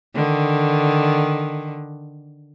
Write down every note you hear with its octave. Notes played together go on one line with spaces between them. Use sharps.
D3 D#3